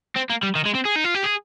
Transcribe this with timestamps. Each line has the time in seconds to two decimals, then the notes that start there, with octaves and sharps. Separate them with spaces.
0.16 C4
0.30 A#3
0.43 G3
0.55 D#3
0.65 G#3
0.75 C4
0.85 G#4
0.95 D#4
1.04 F4
1.15 G4
1.24 G#4